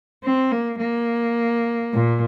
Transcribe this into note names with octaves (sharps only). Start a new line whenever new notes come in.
C4
A#3
A#3
A#2